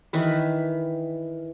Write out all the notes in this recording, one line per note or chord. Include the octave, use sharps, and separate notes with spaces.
D#3 E3 B4